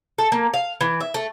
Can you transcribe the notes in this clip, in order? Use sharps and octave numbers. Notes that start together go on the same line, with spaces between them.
A4
A#3
F5
E3
E5
A3